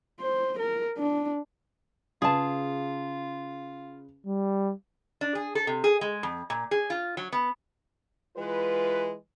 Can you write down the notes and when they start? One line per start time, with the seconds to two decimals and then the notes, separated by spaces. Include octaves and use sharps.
0.20 C5
0.59 A#4
0.98 D4
2.22 C#3 F4 G#4 B4 A5
4.26 G3
5.21 D4
5.35 G#4
5.55 A4
5.67 C3
5.84 G#4
6.01 G#3
6.23 F2
6.50 A#2
6.71 G#4
6.90 F4
7.17 F#3
7.32 B3
8.37 E3 G#3 F4 B4